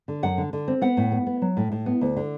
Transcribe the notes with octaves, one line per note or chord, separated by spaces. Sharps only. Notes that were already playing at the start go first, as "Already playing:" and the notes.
D3
F#2 F#5
D3
D3
C4
B3 F#5
A2
B3
B3
F#3
A2
A2
B3
D2
D3